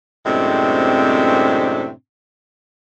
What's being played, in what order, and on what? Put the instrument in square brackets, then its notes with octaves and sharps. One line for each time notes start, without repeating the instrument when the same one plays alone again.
[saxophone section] F#2 A2 C3 G#3 C4 D4